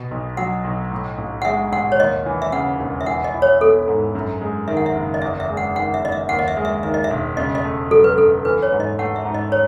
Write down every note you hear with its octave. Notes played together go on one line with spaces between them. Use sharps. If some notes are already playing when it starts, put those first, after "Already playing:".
Already playing: B2
B1
F#3 F#5
B1
A2
A1
F#5
G#3 E5
A1 F#5
C#5
D#2 D#5
E3
E5
C#3 F#5
E1
E5
E3 F#5
D#5
E4
C#5
B3 A4
G#2
F#2
G#3
D#3 E5
F#5
E5
F#1
D#5
E2 E5
E5
G#3
F#5
D#3 F#5
E5
F#1 D#5
E5
D#2 F#5
D#5
E5
G#3
E5
D#3 E5
D#5
E5
E1
C#3 D#5
D#5
A3
F#3 A4
B4
F#2 A4
E3 B4
C#5
G#2
D#5
A3 F#5
E5
G#2
D#5
C#5